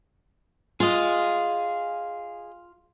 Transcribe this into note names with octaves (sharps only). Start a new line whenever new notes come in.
F4 G#4 D#5